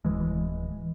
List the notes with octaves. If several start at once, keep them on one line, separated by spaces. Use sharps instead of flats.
D1 C2 E3 G#3